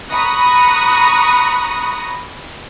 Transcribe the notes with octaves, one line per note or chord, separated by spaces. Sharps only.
A#5 B5 C#6 D#6 F#6 A#6